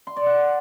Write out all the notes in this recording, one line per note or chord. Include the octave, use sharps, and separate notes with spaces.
C6
D5
F#5